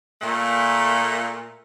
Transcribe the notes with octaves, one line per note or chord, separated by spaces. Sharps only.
A#2 A3